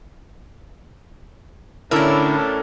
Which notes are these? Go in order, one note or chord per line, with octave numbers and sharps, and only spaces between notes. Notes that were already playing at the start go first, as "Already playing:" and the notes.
A2 D3 A#3 C#4 D4 E4 A4 A#4